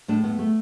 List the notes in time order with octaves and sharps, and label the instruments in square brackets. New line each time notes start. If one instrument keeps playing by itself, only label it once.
[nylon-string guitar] A2 A3 D4
A3 B3
A3